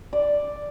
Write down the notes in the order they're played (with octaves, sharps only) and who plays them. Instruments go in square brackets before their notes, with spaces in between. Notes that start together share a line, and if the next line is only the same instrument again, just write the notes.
[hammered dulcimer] D5